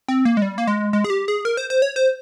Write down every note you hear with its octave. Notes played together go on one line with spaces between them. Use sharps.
C4
A#3
G#3
G3
A#3
G#3
G#3
G#4
G4
G#4
A#4
C5
C5
C#5
C5